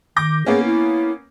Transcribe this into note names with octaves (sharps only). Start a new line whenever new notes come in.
D#3 D6 G6 A#6
A#3 B3 C#4 G#4
E4